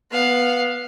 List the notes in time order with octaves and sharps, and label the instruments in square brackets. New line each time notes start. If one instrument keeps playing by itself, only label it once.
[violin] B3 F5